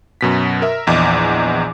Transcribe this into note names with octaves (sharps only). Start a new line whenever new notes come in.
F#2 B2 B6
A#4 E5
A#1 E2 D#5 D6